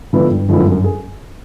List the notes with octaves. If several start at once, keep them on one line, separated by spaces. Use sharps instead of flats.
G#2 D3 F3 G#3 B3 E4
G2
F#2 D3 F3 G#3 B3 E4
F#2
F#2
G#4